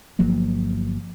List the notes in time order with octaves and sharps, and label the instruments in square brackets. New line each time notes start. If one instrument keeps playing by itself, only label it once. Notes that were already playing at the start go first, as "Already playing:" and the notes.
[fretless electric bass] G1 F3 F#3 A#3